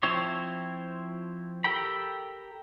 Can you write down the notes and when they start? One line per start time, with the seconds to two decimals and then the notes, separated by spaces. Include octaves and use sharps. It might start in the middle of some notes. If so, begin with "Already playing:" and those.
0.03 F3 C4 E4 C5 C#5
1.64 G4 A4 A#4 G5 B5